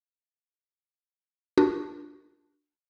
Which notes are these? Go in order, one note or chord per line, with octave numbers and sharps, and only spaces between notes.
D4 F4 F#4 A#4